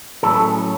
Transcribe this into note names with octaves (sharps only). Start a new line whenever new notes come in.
A2 F#3 A3 C#4 A4